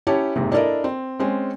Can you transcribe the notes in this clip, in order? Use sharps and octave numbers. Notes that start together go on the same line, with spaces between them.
C#4 E4 G4 C#5 A5
F#1 G#2 C3
D4 E4 A4 A#4 D5 D#5
C4
G#3 C4 C#4